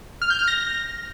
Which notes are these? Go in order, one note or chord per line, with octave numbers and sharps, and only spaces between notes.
F6
G6
F6
A#6